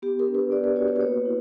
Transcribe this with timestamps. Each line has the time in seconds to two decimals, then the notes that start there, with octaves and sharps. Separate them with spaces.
0.02 B3 G4
0.19 A#4
0.28 D4
0.35 B4
0.51 B3 D5
0.64 B4
0.76 F#4 C#5
0.88 C#5
0.96 B4
1.01 A#3 C#5
1.25 E4